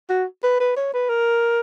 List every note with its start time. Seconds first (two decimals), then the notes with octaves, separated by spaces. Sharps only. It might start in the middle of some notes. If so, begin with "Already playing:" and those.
0.10 F#4
0.44 B4
0.60 B4
0.77 C#5
0.94 B4
1.09 A#4